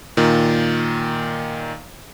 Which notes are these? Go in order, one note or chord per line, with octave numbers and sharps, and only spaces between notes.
A#2 D#3